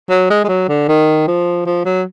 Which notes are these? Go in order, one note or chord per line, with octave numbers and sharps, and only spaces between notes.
F#3
G#3
G#3
F#3
D3
D#3
F3
F3
F#3